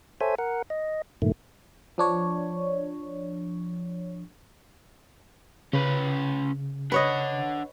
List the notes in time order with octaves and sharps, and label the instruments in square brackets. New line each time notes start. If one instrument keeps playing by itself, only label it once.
[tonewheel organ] A4 C5 C#5 E5 G#5
A#4 F#5
D#5
G2 A#2 D#3 A3
[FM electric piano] F3 D4 C#5
[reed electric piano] C#3 [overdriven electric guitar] C#4 B4
[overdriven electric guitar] D4 F#5 [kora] B4 C#5 D#5